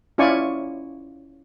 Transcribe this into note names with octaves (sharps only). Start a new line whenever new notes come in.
C#4 E4 F4 D5 G#5 C#6